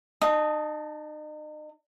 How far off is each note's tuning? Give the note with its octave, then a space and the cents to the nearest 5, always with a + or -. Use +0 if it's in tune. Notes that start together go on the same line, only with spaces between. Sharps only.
D#4 -35 A5 +0 D#6 +0